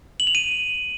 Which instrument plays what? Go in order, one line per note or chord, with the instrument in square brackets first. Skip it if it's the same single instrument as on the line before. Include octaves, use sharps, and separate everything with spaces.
[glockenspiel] F#7
F7
D#7